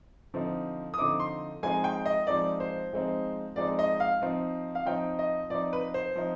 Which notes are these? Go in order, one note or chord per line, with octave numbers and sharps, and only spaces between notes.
D3 F3 C4 D#4
D#6
D3 F3 C4 D#4 D6
C6
F3 G#3 C4 D#4 G#5
G5
D#5
F3 G#3 C4 D#4 D5
C5
F3 G#3 C4 D#4
F3 G#3 C4 D#4 D5
D#5
F5
F3 C4 D#4
F5
F3 C4 D#4 G5
D#5
F3 C4 D#4 D5
B4
C5
F3 C4 D#4